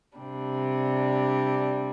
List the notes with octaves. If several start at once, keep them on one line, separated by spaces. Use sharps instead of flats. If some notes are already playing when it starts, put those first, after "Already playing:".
C3 G3 D4